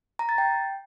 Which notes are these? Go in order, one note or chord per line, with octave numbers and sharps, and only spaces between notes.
A#5
A6
G5